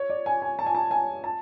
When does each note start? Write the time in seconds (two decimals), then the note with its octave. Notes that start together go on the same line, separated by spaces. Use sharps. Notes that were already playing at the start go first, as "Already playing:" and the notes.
Already playing: C#5
0.10 D5
0.26 G#5
0.42 G#5
0.59 A5
0.66 G#5
0.75 A5
0.91 G#5
1.24 A5